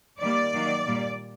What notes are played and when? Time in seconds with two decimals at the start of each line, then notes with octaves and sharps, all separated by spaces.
0.21 D#3 G3 A#3 D5
0.53 D#3 F#3 A#3
0.86 A#2 G3 A#3